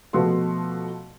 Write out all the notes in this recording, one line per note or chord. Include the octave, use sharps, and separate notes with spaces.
B2 F3 A3 F#4 B4 C6